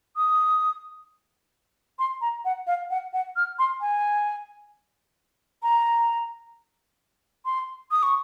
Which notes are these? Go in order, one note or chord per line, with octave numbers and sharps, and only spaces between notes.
D#6
C6
A#5
F#5
F5
F#5
F#5
F6
C6
G#5
A#5
C6
D#6
C#6